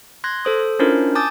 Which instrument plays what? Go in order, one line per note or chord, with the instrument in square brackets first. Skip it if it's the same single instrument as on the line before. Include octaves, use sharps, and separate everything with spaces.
[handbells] C6 F#6 G#6 A#6
A4 C5 D#6
C#4 D4 E4 F4 A#4 C5
G#5 A5 D6 D#6 G6 A6